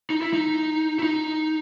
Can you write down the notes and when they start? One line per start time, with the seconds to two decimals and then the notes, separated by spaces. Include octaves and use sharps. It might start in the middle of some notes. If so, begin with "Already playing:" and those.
0.10 D#4
0.22 E4
0.33 D#4
0.99 E4
1.03 D#4